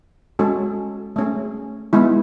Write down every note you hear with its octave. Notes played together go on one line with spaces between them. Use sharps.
G#3 C#4 F#4 A4
A3 C#4 G#4
G#3 B3 E4